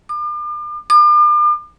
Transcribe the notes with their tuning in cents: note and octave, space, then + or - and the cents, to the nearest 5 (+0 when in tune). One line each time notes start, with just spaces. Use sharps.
D6 +40
D6 +40